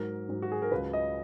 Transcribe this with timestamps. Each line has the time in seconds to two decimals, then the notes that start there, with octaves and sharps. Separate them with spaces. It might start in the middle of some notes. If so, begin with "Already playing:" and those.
Already playing: G#2 F#3 A#4
0.29 G#2 F#3
0.42 F#4
0.52 G#4
0.62 A#4
0.71 C#2 C#3 F#3 B4
0.93 D#5